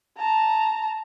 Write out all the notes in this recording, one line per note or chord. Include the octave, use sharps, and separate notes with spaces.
A5 A#5